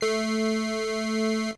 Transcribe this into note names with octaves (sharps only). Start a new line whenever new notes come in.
A3 C7